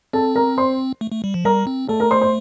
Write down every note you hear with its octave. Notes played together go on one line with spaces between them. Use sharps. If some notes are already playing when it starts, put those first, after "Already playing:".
C4 A4 A5
A#4 A#5
C5 C6
A3
A3
G3
F3
G3 A#4 A#5
C4
A3 A4 A5
A#4 A#5
C5 C6
C5 C6